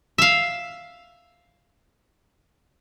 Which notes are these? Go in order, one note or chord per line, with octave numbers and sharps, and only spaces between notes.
E5 F5